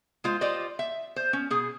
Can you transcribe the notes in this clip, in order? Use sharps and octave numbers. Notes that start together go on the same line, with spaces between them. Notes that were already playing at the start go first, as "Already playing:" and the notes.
G#3 F4 C5
F4 G4 C5 D5 D#5
E5
C5
C#4
B2 G#4